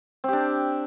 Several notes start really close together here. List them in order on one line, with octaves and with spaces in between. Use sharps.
C4 G4 D4